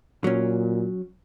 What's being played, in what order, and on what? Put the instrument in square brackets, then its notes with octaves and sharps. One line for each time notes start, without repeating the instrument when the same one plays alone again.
[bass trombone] A#2 [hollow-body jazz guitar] F#3 C#4